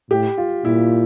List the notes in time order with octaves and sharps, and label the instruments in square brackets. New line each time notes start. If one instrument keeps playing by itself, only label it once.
[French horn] A2 [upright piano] G4
[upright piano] F4
[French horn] A#2 [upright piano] E4